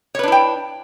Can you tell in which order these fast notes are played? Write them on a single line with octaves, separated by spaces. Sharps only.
C#5 B4 D4 E4 G5